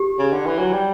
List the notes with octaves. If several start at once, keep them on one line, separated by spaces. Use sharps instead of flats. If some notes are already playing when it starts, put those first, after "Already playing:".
Already playing: G4
C#3
D3
E3
F#3
G3